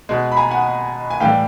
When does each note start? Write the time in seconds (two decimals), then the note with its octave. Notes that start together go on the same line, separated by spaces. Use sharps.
0.09 B2 G#3
0.32 B5
0.37 G#5 A#5
0.51 F#5 G#5
1.10 G#5
1.20 A2 E3 G3 F5 G5